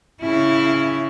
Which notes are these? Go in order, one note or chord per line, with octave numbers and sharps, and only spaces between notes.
C#3 E4